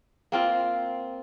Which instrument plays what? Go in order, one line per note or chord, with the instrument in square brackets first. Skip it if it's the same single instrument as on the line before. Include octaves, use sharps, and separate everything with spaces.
[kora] A#3 C4 F4